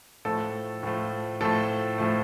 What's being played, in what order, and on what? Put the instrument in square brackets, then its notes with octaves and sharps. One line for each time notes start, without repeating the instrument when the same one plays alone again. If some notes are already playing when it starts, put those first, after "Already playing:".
[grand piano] A2 F3 A3 A4
A2 F3 A3
A2 F3 A3 A4
A2 F3 A3